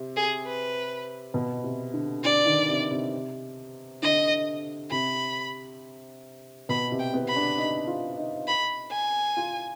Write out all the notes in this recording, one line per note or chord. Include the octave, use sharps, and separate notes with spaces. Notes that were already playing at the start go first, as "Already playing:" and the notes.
Already playing: C3
G#4
B4
B2
C3
D3
D3 D5
D#3
C3
C3
D3 D#5
C3 B5
B2 B5
C3
G5
B3
B5
D4
D#4
F4
D#4
B5
G#5
F4